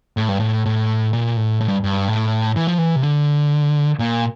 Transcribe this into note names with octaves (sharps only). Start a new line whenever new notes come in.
A2
G2
A2
A2
A#2
A2
A2
G2
G2
A2
E3
F3
E3
C3
D3
A#2